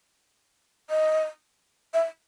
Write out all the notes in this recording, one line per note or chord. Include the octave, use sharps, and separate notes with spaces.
D#5
E5